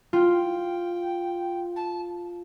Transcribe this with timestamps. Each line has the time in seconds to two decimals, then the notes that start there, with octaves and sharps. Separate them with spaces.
0.13 F4 G5
1.76 A5